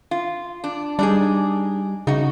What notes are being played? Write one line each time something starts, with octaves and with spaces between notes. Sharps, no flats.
F4
D4
G3 D4 D#4 G#4
C#3 D#4 F#4